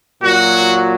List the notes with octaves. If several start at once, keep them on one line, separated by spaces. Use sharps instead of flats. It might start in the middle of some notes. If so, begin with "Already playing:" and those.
A#2 F#3 F#4